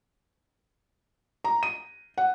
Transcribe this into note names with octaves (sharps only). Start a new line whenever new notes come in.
A#5
D#7
F#5